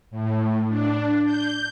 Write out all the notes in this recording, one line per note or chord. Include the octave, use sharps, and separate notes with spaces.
A2
D4
G6